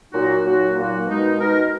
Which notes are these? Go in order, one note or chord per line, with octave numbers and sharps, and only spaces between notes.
A#2 F#3 A#3 D#4 F#4
A#2 F#3 A#3 D#4 F#4
A#2 F#3 A#3 D#4 F#4
B2 G#3 D#4 A#4
B2 G#3 D#4 A#4